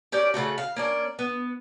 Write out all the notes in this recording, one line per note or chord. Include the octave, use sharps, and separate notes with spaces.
C#4 G4 A#4 D5
C#3 E3 A3 F#4
F5
A#3 C#4 D4
B3